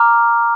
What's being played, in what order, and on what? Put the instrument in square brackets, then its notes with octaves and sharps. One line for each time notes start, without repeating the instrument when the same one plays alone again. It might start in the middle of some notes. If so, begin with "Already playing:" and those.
Already playing: [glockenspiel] A#5 D6 F6